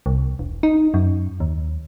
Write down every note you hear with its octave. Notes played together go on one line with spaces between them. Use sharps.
C2
E1
D#4
F#2
D#2